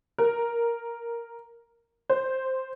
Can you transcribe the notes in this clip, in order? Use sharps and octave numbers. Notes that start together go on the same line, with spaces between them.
A#4
C5